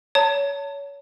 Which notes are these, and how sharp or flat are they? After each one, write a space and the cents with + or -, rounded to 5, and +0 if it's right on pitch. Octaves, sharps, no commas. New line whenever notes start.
C#5 +25 A5 +30